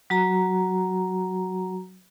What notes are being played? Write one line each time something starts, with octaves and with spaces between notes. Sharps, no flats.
F#3 F#4 A#5